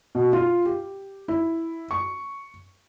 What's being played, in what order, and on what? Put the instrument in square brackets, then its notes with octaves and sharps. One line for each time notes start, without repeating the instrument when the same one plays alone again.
[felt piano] B2
F4
G4
E4
C#6